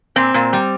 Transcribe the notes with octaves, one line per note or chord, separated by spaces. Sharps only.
A#2 C4
A#2
G3